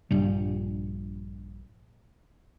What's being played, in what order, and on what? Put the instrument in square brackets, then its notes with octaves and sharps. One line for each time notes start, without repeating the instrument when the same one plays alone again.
[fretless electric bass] A#1 G2 G3